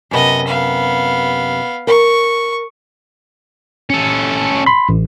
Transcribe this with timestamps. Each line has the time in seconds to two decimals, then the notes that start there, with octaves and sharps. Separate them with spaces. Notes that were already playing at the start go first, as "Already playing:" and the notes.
0.11 F#2 C3 B3 D#5
0.47 B3 F5
1.87 A#4 C#6
3.90 C#4 A4
4.66 B5 C6
4.89 A1